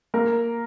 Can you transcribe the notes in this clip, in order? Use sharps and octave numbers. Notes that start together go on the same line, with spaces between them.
A#3 A#4